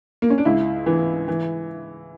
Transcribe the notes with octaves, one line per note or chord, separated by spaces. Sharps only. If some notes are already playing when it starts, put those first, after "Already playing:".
A#3
C#4
D4
C#2 E4
E3
E3